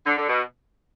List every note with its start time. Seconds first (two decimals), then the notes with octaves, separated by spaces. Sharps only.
0.05 D3
0.17 D3
0.28 B2